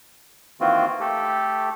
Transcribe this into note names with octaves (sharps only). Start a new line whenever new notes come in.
D#3 E3 A#3 C4 F4 F#4
A3 G4 A4